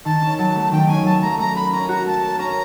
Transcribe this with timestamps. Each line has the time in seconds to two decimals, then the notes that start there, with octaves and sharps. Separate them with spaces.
0.05 D#3 A5
0.22 C#4
0.38 F#3 A5
0.56 A3
0.72 D#3 G5
0.88 C#4 G#5
1.05 F#3 A5
1.22 A3 A#5
1.39 A3 A#5
1.55 A#4 B5
1.72 C#4 A#5
1.89 F#4 A#5
2.06 A3 A5
2.23 A#4
2.39 C#4 A#5